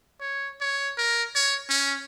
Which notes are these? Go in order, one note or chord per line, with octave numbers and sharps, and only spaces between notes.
C#5
C#5
A#4
C#5
C#4